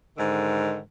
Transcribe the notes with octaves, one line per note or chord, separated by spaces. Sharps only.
G#2 D3 D#3